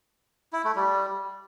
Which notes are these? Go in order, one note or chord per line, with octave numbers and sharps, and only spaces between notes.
E4
A3
G3